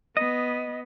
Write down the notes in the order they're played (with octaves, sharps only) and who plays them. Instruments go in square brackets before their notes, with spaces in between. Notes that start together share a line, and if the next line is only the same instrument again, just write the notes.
[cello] B3 [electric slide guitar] D#5